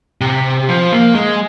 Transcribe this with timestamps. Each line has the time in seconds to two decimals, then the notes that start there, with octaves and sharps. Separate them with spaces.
0.21 C3
0.68 F3
0.92 A#3
1.15 G#3